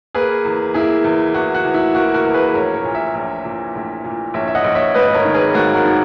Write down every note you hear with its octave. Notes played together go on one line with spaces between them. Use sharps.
A#3 G#4 B4
E2
A#3 E4 G#4
E2
E2 F#4
F#4
E2
E4
A#3 F#4
F#4 A#4
E2
G#4 B4
A#1 A#4 C#5
A#4 C#5
A#2
C#5 E5
A#1
A#2
A#1
A#2
A#1 C#5 E5
E5
D#5 F#5
A#1
C#5 E5
G#1 B4 D#5
A#4 C#5
D#3
G#4 B4
G#1 F#4 A#4
F#4 A#4
D#3